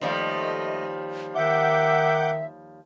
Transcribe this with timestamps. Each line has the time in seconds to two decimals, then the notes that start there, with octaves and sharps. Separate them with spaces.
0.01 D#2 F3 G3 A3 D#5
1.35 D#3 E5 F#5 D6 G6